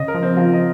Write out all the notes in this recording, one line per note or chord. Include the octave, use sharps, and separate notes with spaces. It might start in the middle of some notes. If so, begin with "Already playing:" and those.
Already playing: C#3 D#5
A#4
F3
C4
F3 F4
D#5